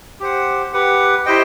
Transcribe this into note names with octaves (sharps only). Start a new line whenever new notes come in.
G4 C5 F#5
G4 B4 F#5
E4 G4 C5 D#5 G5